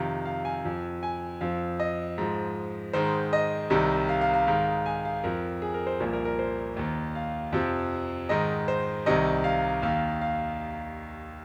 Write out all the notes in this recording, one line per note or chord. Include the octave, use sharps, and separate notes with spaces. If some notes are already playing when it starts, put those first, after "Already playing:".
Already playing: F2 C3 D#3 F5
F5
G#5
F2 F3
G#5
F2 F3 F5
D#5
G#2 F3
G#2 D#3 C5
D#5
C2 C3 D#3
F5
F5
F5
G#2 D#3 F5
G#5
F5
F2 F3 A#4
G#4
A#4
C5
C2 A#2 F3 A#4
A#4
A#4
C5
D#2 D#3
F5
F2 C3 F3
G#2 D#3 D#5
C5
C2 C3 D#3 D#5
F5
D#2 D#3 F5
F5